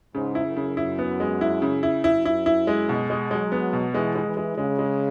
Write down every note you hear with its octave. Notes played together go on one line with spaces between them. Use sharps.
G#2 C#3
E4
F#2
C#3
F#2 E4
B3
G#3
E4
C#3
E4
F#2 E4
E4
E4
G#3
B2
G#3
F#3 G#3
B3
B2
E3 G#3
G#3
E3
G#3
C#3 G#3
G#3